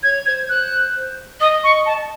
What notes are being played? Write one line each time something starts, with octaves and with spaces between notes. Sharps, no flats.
C#5 G#6
C5 G#6
C5 F#6
D#5 D#6
C#6
A5